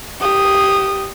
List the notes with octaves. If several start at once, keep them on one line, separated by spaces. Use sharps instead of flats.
G4 D#6